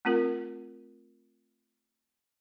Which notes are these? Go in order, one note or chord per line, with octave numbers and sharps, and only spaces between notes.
A3 C4 F4 A#4